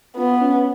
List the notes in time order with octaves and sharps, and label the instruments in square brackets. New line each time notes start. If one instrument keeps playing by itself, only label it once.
[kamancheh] B3 [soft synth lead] F4
[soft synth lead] C#4